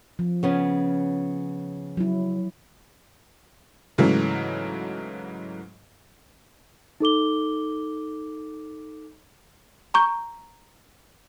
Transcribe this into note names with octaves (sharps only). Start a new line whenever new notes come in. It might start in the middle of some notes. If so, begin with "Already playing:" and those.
F3
C#3 B3 C#4
F#3 E4
G#2 C#3 E3 F#3 A3
D#4 A4 D6 G7
A#5 C#6 G6